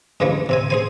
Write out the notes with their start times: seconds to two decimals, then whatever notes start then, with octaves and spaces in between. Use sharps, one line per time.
0.20 G2 C#3 E3 F3 G3 A3
0.49 C3 C4 G#5
0.70 G#4 C5 G#5